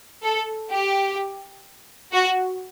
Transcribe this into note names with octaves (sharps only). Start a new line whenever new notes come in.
A4
G4
F#4